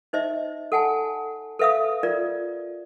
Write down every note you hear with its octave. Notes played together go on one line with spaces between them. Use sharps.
D#4 C5 D#5 E5
A4 F#5 G#5 A5
A4 B4 E5 F5 D#6
F4 A#4 D5